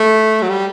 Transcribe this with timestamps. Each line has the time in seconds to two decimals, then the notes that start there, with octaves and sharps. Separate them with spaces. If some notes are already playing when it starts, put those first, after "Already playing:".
Already playing: A3
0.42 F#3
0.49 G3